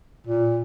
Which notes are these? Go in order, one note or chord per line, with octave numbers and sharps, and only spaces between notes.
A#2